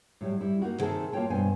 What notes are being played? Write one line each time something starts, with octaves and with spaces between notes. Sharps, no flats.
A2 F#3 G3
G3 E4
A#3 D#4 F#4
C3 D#3 G#4 A4 A5
A#3 F4 F#4 C#5 G5 A5
G2 B2 C5 G#5